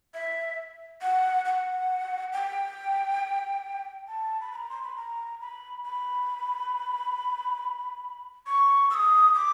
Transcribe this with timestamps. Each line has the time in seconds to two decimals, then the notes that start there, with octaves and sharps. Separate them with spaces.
0.14 E5
1.02 F#5
1.45 F#5
2.33 G5
4.08 A5
4.41 B5
4.52 B5
4.56 A#5
4.70 C6
4.83 B5
4.96 A#5
5.40 B5
5.83 B5
8.46 C#6
8.90 E6
8.94 D#6
9.35 D6